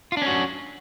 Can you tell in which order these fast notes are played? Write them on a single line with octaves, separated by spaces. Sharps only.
F4 D4 C#4 F#4